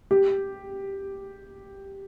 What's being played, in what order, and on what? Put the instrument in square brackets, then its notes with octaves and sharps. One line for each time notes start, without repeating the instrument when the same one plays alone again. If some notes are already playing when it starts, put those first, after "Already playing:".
[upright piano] G4